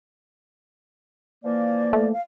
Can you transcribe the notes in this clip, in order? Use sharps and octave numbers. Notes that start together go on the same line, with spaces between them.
E3 F3 A#3 D5
A3
F5